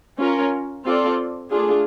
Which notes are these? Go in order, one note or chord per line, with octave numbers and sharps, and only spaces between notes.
C#4 F4 A#4 C#5
C4 F4 A4 D5
A3 D4 F4 G#4